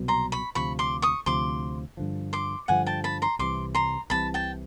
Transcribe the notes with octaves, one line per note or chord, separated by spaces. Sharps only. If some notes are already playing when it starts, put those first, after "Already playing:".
Already playing: C2 B2 F#3 B3
A#5 C6
B5 C#6
D2 C3 F3 B5 C#6
C6 D6
C#6 D#6
D2 C3 F3 C6 D6
G2 D3 F3
C6 D6
G2 D3 F3 F#5 G#5
G5 A5
A5 B5
A#5 C6
C2 C3 E3 C6 D6
A#5 C6
C2 C3 E3 A5 B5
G5 A5